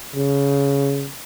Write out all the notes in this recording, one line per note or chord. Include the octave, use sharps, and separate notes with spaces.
C#3